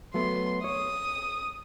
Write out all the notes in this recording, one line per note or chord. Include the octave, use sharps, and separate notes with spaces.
F#3 A3 B3 C6
C#5 D#6